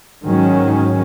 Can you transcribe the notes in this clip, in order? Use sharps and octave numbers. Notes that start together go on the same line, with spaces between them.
G#2 D#3 F#3 C#4